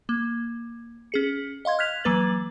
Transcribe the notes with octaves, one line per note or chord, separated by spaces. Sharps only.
A#3
C#4 G#4 C#7
D#5 F5 C6 G#6
F6 F#6 G#6 B6 F7
E3 F#3 A#3 B4 A6 F#7